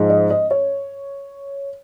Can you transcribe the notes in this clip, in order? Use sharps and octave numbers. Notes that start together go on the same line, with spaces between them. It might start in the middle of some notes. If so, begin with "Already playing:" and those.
Already playing: G#2 F3 G#3
D#5
D#5
C#5